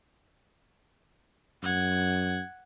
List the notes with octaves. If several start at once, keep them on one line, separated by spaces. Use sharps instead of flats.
F#2 F#5 G#6